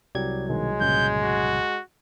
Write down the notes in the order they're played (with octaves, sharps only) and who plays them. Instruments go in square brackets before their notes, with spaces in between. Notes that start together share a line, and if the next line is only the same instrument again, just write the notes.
[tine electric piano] C2 F#3 G#6 [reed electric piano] G4 D5
[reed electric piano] B2 D#3 [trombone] G#3
[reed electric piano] G2 A#2 C#3 [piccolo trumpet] G6
[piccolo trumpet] F#4